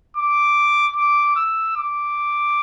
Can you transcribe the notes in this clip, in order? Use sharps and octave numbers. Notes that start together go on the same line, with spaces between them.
D6
D6
E6
D6